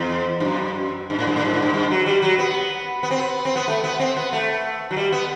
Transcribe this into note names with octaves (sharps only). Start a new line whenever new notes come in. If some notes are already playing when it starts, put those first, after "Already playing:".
Already playing: E2
G2
F#2
G2
A2
G2
A2
G2
A2
G2
G2
F#3
G3
F#3
B3
B3
C4
B3
C4
B3
A3
B3
C4
B3
A3
F#3
G3
B3